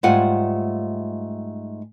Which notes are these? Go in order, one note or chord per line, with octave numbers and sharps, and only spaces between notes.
G#2 G3 A3 F4 F#5 G#5